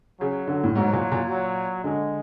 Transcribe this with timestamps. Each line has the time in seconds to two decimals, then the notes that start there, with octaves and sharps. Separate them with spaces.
0.20 C#3 F#3
0.47 D3
0.64 A2
0.75 G#2 F#3
0.93 A#2
1.12 A#2
1.30 F#3
1.84 D3 G#3